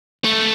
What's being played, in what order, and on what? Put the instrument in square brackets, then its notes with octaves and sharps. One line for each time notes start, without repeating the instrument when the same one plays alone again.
[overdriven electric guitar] A3